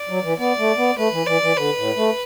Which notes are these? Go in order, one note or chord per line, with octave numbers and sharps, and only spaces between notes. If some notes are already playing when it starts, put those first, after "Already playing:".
Already playing: D5
F#3
E3
B3 D5
A3
B3
A3 B4
E3
E3 D5
E3
D3 B4
A2
A3